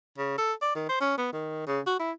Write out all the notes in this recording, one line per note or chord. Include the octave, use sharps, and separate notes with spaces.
C#3
A4
D5
D#3
C5
C#4
B3
D#3
C#3
F#4
E4